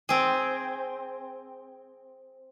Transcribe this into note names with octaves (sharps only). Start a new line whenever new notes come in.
C4 G#4